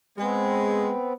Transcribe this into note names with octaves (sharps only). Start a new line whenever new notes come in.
G#3 B3 C4